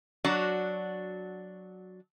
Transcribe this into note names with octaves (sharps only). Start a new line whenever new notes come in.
F#3 D4 F#4